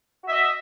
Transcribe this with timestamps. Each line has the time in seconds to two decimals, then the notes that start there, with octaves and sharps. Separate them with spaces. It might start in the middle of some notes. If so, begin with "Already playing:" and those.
0.24 F#4
0.27 E5
0.31 D#5